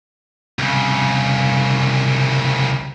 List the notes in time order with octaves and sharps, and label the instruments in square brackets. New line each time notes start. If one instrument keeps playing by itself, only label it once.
[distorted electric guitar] C2 C#3